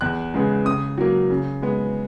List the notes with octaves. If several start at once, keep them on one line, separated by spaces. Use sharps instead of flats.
E2 F#6
C#3 G#3 B3
C#3 D#6
F#3 A#3
C#3
G#3 B3